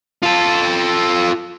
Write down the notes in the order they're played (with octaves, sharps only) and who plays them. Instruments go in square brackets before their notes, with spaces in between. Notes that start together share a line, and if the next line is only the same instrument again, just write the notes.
[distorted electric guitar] F4 A4